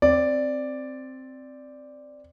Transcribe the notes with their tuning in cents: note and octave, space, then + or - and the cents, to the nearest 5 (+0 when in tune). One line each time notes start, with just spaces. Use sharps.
C4 +0 D5 +0